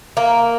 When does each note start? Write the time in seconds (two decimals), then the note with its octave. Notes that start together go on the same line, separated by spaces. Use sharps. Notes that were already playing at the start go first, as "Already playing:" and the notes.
0.17 A#3